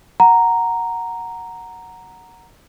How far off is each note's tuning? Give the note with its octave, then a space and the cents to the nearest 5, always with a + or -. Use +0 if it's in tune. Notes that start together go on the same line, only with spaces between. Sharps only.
F#5 +0 A#5 +0